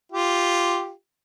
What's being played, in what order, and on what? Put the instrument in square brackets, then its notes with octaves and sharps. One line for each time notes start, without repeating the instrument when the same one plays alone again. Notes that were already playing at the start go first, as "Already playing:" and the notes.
[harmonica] F4 G4